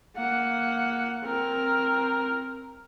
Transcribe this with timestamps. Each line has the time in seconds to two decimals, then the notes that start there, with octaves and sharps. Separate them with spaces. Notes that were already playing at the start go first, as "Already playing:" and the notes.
0.17 A#3 F#5
1.24 C4 A#4